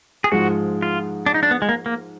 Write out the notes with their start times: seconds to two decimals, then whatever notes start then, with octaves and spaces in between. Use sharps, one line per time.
0.24 G#4
0.32 G#2 F3 G#3 F#4
0.82 F4
1.26 D4
1.34 D#4
1.43 D4
1.51 B3
1.62 G#3
1.69 A#3
1.86 A#3